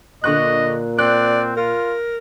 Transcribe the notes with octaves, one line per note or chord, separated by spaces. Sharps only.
A#2 D3 D#5 C#6 F#6
C4 D5 F#6
F4 A#4